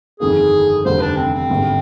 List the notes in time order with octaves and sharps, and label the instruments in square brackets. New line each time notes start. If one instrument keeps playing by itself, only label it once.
[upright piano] G1 F2 D#3 A#3 [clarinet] G#4
[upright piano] F1 D#2 D3 G3 [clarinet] C5
[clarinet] D4
C4
C4
[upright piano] G#1 G2 D3